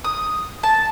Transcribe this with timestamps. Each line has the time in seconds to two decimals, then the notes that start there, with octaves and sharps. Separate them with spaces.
0.05 D#6
0.63 A5